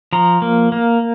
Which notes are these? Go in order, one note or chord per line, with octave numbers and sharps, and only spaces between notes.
F3 A#5
A#3
A#3